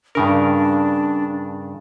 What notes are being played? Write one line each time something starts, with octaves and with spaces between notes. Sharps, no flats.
G2 C#3 D4 A#4